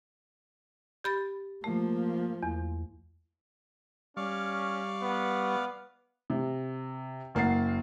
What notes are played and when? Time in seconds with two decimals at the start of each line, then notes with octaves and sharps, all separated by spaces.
1.04 G4 B5 A6
1.64 F3 A3 A#3
2.43 E2
4.17 G3 C#4 D5 F5 C#6 F6
5.02 B3
6.30 C3
7.35 F#1 A#3 F#5 A6 C7